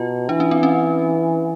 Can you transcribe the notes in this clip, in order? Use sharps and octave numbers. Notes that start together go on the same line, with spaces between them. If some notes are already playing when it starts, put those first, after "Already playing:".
Already playing: B2 F4
E3 D4
C#4
C4
C#4